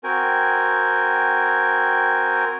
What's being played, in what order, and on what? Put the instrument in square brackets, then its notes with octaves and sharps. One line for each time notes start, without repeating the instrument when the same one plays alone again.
[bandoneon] C4 F#4 A#4 G5 G#5